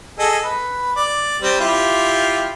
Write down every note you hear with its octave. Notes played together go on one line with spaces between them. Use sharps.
G#4 A4 D#5
B4
D5
G3 C4
E4 F4 G4